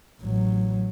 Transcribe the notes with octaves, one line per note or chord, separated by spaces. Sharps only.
A1 F#3